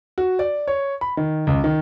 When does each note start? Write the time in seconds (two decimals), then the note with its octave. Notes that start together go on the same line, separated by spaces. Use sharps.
0.18 F#4
0.39 D5
0.68 C#5
1.01 B5
1.17 D#3
1.47 C#2
1.64 D#3